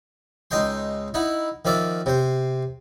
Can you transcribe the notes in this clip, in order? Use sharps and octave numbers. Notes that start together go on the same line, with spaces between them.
C#2 D#4 D#5 G5 C6
D#4 E4 F#5
D#3 F3 D5 E5 D6
C3 C5